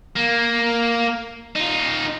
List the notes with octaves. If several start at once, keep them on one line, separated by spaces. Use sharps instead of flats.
A#3
D#4 F4